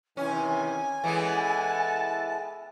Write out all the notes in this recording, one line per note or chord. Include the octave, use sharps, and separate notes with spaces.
C3 D#3 E3 C#4 G#5
E3 G#3 B3 A4 F#5 A5